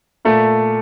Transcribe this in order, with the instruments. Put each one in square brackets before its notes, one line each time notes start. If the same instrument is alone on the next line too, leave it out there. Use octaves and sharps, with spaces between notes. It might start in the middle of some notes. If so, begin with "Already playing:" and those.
[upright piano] A#2 A3